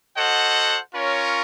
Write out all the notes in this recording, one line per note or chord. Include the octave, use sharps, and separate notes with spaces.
F#4 A4 C5 D#5 F#5
C#4 F4 A#4 C#5